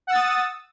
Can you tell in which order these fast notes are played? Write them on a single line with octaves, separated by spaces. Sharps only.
F#5 E6 A6 D#6